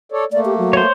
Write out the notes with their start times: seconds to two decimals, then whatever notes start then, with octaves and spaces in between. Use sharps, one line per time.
0.12 A4 C#5 D5
0.32 A3 A#3 D5
0.45 G4
0.58 F#3
0.73 C5 C#5